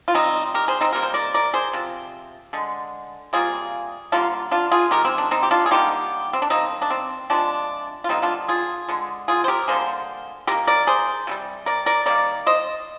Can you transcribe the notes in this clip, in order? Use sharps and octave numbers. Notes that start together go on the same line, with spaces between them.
F4
C3 D#3 G3 C4 D#4
G4 A#4
G#4 C5
C4 D#4
C3 G3 A#3 A#4
C5
A#4 D5
A#4 D5
G#4 C5
C3 F3
D3 G#3
C3 G3 A#3 F4 G#4
D3 G3 A#3 D4 F4
D4 F4
F4 G#4
D#3 G#3 G4 A#4
C4
D4
C4 D#4
G4
D4 F4
G#4
D3 G3 A#3 D#4 G4
C4
D4
D#3 G3 A#3 C4 D#4
D4
C4
C3 F3 G#3 D4
F4
D3 G3 A#3 C4 D#4
D4 F4
F4 G#4
D3 G#3
F4 G#4
C5
G4 A#4
D3 G3 A#3 G#4 C5
D#3 A#3 G4 A#4
A#4 D5
G#4 C5
C3 D#3 G3
A#4 D5
A#4 D5
D#3 G3 A#3 A#4 D5
C5 D#5